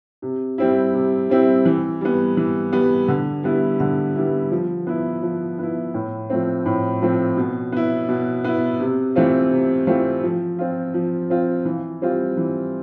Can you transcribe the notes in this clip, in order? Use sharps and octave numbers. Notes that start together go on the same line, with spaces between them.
C3
G3 C4 E4
C3
G3 C4 E4
E3
G3 B3
E3
G3 B3
D3
G3 B3 E4
D3
G3 B3 E4
F3
B3 E4
F3
B3 E4
A2
F3 A3 C4
A2
F3 A3 C4
B2
B3 E4
B2
B3 E4
C3
E3 A3 C4 F4
C3
E3 A3 C4 F4
F3
C4 F4
F3
C4 F4
E3
G3 C4 F4
E3